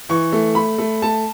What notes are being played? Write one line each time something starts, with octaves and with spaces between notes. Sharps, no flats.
E3 C#6
A3
A3 B5
A3
A3 A5